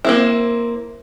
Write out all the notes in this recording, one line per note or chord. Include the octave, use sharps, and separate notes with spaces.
A#3 C4 E4